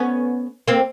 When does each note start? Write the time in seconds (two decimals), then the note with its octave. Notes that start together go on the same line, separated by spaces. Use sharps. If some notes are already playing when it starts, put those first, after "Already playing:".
Already playing: B3 C#4
0.68 A#3 C4